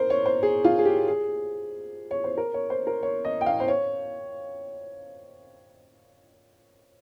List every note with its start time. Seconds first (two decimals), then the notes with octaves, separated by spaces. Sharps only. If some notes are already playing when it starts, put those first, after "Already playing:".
Already playing: A#4 C5
0.10 C#5
0.26 C5
0.43 G#4
0.64 F4
0.79 G#4
0.85 G4
1.08 G#4
2.11 C#5
2.24 C5
2.38 A#4
2.54 C#5
2.70 C5
2.87 A#4
3.03 C#5
3.25 D#5
3.41 G5
3.46 F5
3.60 C5
3.68 C#5